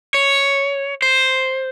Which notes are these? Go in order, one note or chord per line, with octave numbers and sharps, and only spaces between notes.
C#5
C5